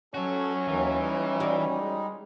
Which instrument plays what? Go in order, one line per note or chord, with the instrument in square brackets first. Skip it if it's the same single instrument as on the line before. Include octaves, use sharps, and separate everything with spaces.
[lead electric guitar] F#3 F#4 [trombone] C#4 [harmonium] A4
[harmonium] D#2 D#3 F#3 [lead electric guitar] E3
[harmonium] G3 D#4
[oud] F#4 D5
[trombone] G#3